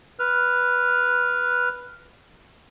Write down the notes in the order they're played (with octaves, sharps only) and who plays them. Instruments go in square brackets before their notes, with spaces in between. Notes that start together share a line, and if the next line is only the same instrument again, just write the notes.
[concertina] B4 F6